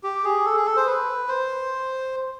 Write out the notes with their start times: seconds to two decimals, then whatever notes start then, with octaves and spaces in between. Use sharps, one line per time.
0.03 G4
0.24 G#4
0.45 A4
0.56 G#4
0.66 A4
0.76 C5
0.86 B4
1.28 C5